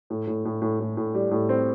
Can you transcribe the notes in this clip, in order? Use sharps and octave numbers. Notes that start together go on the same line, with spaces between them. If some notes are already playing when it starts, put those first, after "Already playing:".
A2
A2
A2
A2
A2
A2
G3
A2
C4